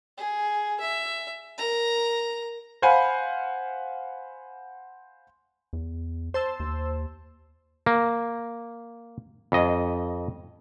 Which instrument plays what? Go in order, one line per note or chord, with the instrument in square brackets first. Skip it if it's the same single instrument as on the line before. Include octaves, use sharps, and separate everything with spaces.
[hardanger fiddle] G#4
E5
A#4 A#5
[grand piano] C5 F5 F#5 G#5 B5
[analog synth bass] E2
[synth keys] C5 A5 E6
[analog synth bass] D#2
[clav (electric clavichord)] A#3
F2 D#5